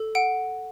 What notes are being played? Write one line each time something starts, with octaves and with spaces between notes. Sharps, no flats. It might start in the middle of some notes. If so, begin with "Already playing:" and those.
Already playing: A4
F#5 D7